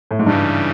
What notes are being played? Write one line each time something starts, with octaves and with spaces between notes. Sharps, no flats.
A2
G#2
G2 C#3 E3 G3